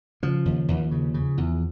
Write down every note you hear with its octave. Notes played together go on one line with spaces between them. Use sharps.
C#3 F3
D#2
D#2
C#3
C#3
E2